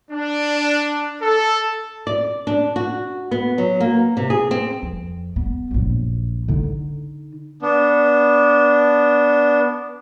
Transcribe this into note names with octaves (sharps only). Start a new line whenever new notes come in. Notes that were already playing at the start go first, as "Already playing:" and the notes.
D4
A4
D5
D4
F#4
B3
F#3
A#3
C3
G#4
C4
F2
B3
A#1 F#2
D3 D#4
B3 D4